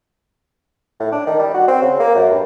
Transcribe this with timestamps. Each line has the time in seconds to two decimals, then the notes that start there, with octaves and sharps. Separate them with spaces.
1.00 A2
1.12 D4
1.27 D#3
1.39 G3
1.54 F#4
1.68 C4
1.82 C#3
2.00 A#3
2.15 F#2
2.31 G2